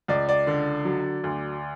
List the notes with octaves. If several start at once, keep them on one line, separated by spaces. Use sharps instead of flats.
C#2 D5
D5
D3
F#3
D2